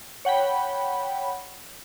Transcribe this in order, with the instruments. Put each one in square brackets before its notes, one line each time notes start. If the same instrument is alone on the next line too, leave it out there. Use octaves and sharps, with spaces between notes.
[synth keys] C#5 F#5 G5 B5